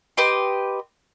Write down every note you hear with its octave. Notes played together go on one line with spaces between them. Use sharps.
G4 B4 D#5 C6